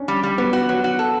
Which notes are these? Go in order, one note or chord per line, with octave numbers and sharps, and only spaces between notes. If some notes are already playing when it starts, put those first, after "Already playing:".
Already playing: C#4 D4
G3
G3
F#3 B3
F#4
F#3
F#4
A4